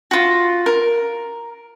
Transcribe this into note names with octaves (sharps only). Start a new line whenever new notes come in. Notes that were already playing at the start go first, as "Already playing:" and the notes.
F4 F#4
A#4